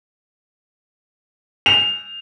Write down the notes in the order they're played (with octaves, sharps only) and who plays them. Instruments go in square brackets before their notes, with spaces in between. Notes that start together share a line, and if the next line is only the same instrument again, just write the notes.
[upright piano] F7